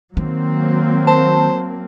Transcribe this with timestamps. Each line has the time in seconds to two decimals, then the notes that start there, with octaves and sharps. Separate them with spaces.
0.17 D#3 F#3 A#3 C4
1.07 C5 A5